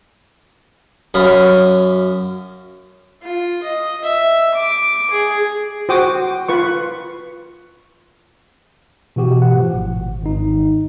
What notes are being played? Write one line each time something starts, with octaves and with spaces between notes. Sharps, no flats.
F#2 C#4 F5 B5 D#6
F4
D#5
E5
D6
G#4
F#4 C5 G5 D6 D#6
F4 B4 C#6
B2 E3 F#4 G4
F#5
A2 F3
G#1
G#1 D#4